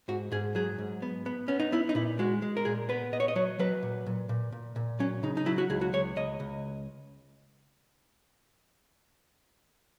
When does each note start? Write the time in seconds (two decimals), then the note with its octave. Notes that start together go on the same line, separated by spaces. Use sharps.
0.08 G#2 F#4
0.32 G#2 G#4
0.55 F#3 G#4
0.78 G#2
1.02 B3
1.26 B3
1.48 B3 C#4
1.60 D#4
1.72 B3 E4
1.89 D#4
1.95 A#2 E4
2.19 G#3 F#4
2.42 G#3
2.57 A#4
2.65 A#2 G#4
2.89 B3 B4
3.12 A#2 D#5
3.20 C#5
3.28 D#5
3.36 F#3 C#5
3.59 F#3 B4
3.83 A#2
4.06 A#2
4.29 A#2
4.52 A#2
4.76 A#2
4.99 F#3 C#4
5.23 C#3 D#4
5.37 D#4
5.46 F#3 E4
5.58 F#4
5.70 C#2 G#4
5.81 F#4
5.93 C#2 C#5
6.16 C#2 D#5
6.40 C#2